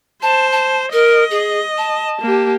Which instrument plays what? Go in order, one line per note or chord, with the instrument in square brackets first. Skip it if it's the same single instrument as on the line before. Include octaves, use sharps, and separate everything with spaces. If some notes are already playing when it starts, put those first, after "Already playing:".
[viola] C5 [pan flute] A5
[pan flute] A5
[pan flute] A#4 [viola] D#5
[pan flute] G#4
A5
[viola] A#3 G4